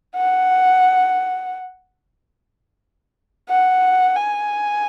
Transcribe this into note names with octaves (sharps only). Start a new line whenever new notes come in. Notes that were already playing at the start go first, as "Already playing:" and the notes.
F#5
F#5
G#5